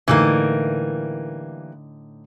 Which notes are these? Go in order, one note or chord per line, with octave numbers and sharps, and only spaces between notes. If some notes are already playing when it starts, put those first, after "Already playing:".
A2 D3 E3 G3 A#3 D#4